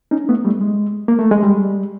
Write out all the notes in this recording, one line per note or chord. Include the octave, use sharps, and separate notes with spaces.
C#4 D#4
A3 B3
G3 A3
G#3
A#3
A3
G#3
G3